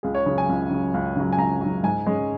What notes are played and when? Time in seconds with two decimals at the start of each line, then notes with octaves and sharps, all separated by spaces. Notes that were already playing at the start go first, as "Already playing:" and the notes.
0.03 C#2 G#4
0.15 C#5
0.26 C#3 F#3
0.38 G#5
0.49 C#2
0.71 C#3 F#3
0.94 C#2
1.16 C#3 F#3
1.33 G#5
1.38 C#2 A#5
1.61 F#3
1.66 C#3
1.83 G#2 G#5
2.06 G#3 C#4